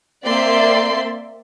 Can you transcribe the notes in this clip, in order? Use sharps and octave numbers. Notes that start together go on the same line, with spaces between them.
A#3 C4 D5 E5 C6